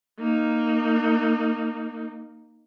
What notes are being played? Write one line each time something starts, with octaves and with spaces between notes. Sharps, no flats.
A#3 D#4